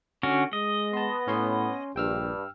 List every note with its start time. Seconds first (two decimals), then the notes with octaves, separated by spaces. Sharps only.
0.23 D3 C#4 F#4
0.53 G#3 D#5
0.93 B3 A5 C6
1.27 A2 C#4 C#5 C6
1.96 A#1 G2 G5 E6 F6